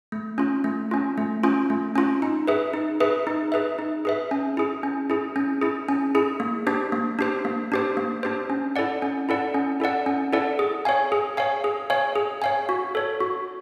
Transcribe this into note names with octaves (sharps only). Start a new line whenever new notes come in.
A3
C#4 F4
A3
C#4 F4
A3
C#4 F4
A3
C#4 F4
D#4
G#4 B4 E5
D#4
G#4 B4 E5
D#4
G#4 B4 E5
D#4
G#4 B4 E5
C#4
E4 G#4
C#4
E4 G#4
C#4
E4 G#4
C#4
E4 G#4
A#3
D4 G4 C5
A#3
D4 G4 C5
A#3
D4 G4 C5
A#3
D4 G4 C5
C#4
E4 A4 D5 F#5
C#4
E4 A4 D5 F#5
C#4
E4 A4 D5 F#5
C#4
E4 A4 D5 F#5
G#4
C#5 F5 G#5
G#4
C#5 F5 G#5
G#4
C#5 F5 G#5
G#4
C#5 F5 G#5
F#4
A4 C#5
F#4